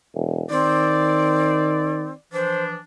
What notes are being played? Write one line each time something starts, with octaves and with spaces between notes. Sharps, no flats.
E1
D#3 C4 D5
E3 F3 D4 C5